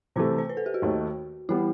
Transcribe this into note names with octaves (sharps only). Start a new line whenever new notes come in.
C3 E3 A3 C5
C5
B4
A4
G4
F#4
D#2 D#3 A3
E3 G3 B3 E4